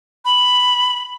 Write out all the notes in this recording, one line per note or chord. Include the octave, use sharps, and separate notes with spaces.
B5